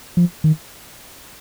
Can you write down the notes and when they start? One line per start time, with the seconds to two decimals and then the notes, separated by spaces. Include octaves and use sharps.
0.17 F3
0.44 D#3